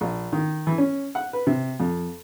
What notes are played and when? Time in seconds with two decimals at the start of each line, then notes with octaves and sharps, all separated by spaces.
0.01 A#1
0.33 D#3
0.67 E3
0.78 C#4
1.15 F#5
1.33 B4
1.47 C3
1.80 F2